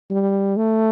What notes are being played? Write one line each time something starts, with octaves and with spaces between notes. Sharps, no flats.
G3
A3